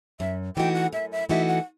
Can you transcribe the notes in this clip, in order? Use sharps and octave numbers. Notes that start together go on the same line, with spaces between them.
F#2 E5
E3 A3 D#4 F#4 G5
F#5
F#2 E5
E5
E3 A3 D#4 F#4 E5
F#5